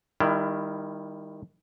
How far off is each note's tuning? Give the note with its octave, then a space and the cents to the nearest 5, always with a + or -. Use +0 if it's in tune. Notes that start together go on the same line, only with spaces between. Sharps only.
D#3 +0 G3 +25 E4 +25